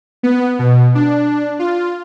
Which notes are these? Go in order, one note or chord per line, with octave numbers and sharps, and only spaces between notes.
B3
B2
D4
F4